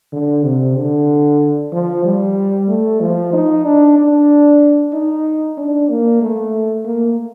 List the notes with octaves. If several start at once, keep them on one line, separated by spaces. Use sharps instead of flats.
D3
C3
D3
F3
G3
A3
F3
D#4
D4
D4
D#4
D4
A#3
A3
A#3